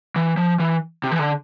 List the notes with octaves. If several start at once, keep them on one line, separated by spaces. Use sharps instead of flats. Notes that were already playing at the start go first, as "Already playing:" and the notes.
E3
F3
E3
C3
E3
D3